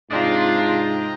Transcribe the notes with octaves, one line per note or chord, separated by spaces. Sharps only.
G#2 C3 D4 F4 D#5 G5 A#5